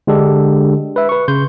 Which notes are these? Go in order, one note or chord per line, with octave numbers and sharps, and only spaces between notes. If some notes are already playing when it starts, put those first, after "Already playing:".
D3 G#3 D4 G4 A4
B4 E5
B4 C#6
C#3 C6 G6